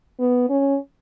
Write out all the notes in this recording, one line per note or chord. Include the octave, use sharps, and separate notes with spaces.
B3
C#4